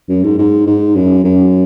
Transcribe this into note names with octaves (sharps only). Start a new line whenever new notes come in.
F#2
G#2
G#2
G#2
F#2
F#2